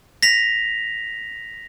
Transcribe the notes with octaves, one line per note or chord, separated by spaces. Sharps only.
A#6 B6 F7